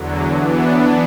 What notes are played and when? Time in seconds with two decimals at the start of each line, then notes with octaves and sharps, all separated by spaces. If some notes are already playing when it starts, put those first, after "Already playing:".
Already playing: E2 D3 F#3
0.36 E3 B3 D4